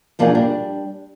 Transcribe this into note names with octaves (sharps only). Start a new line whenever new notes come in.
B2 F3 A#3 D4 D#4 G#4
G3 D4